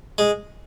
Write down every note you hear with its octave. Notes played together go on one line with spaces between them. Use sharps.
G#3